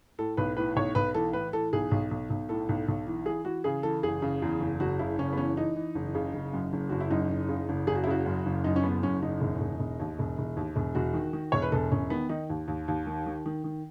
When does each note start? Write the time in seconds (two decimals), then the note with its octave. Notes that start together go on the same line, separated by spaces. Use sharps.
0.19 A2 A4
0.37 B1 B4
0.56 A2 B4
0.76 B1 C#5
0.95 B1 B4
1.14 E3 A4
1.33 A2 B4
1.53 E3 A4
1.73 B1 G#4
1.91 B1
2.11 B1
2.30 B1
2.49 A2 A4
2.69 B1
2.88 B1
3.07 E3
3.26 E3 G#4
3.45 E3 F#4
3.64 C#3 G#4
3.83 E3 A4
4.03 F#1 G#4
4.22 C#3
4.42 E2
4.60 F#1
4.80 F#1 F#4
4.99 C#3 E4
5.18 F#1 C#4
5.33 B3
5.37 E3 C#4
5.56 E3 D#4
5.76 E3
5.95 F#1
6.15 C#3
6.34 F#1
6.54 F#2
6.73 F#1
6.89 F#1 F#4
7.00 E4
7.11 F#2 D#4
7.30 F#1
7.49 C#3
7.69 F#1
7.87 F#1 G#4
7.95 F#4
8.04 E4
8.07 C#3 F#4
8.26 F#2
8.46 F#1
8.64 F#2 D#4
8.76 C#4
8.83 F#1 B3
9.03 F#2 C#4
9.22 F#1 D#4
9.41 E1
9.61 E1
9.79 E1
10.00 D#2
10.19 E1
10.38 E1
10.57 D#2
10.76 E1
10.95 E1 F#4
11.14 D#3
11.33 D#3
11.52 E1 C#5
11.62 B4
11.72 E1 A4
11.92 E1 C#4
12.10 D#3 B3
12.29 D#3 D#4
12.50 D#2
12.68 D#2
12.88 D#2
13.06 D#3
13.26 D#3
13.46 D#3
13.64 D#3